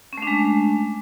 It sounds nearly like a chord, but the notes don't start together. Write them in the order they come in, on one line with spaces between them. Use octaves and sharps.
C#4 A3 D4 G#3